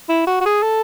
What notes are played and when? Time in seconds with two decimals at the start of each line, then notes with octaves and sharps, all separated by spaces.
0.09 E4
0.27 F#4
0.41 F#4
0.46 G#4
0.63 A4